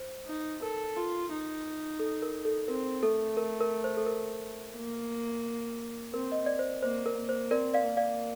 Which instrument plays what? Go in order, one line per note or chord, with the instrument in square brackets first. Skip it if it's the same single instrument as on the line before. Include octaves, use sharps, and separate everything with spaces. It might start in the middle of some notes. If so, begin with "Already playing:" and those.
Already playing: [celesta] C5
[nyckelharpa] D#4
[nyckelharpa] A4 [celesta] A#4
[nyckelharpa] F4
D#4
[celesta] A4
A#4
A4
[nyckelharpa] C4 [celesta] A#4
[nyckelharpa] A3 [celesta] A4
[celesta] A#4
A#4
C5
A4
A#4
[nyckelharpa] A#3
[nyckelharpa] C4 [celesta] A#4
[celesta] D#5
D5
C5
[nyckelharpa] A#3 [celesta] C5
[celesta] A#4
[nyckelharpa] A#3
[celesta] C5
[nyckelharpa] C4 [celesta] A#4 D5
[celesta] D5 F5
[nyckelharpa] A#3
[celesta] D5 F5